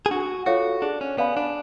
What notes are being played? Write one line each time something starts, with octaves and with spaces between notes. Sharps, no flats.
G#4
D4 F#4
F4 F#4 A4 C#5 F5
D4 G#4
C#4
B3 D5 F5 G#5 B5
D4